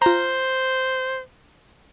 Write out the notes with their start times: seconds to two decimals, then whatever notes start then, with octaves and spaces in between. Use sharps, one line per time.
0.02 F4 C5 A#5